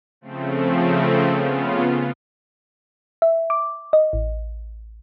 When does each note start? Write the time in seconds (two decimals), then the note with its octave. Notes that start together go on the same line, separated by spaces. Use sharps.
0.21 C#3 F3 A3 C4
1.28 C#3 B3 F4
3.22 E5
3.50 D6
3.93 D#5
4.13 A1